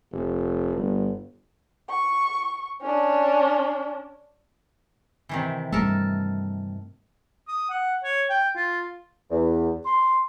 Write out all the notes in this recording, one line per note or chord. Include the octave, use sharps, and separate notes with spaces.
F1
G1
C#6
C#4 D4
C3 D#3 E3
G2 A3 A4 A#4
D#6
F#5
C#5
G5
F4
E2
C6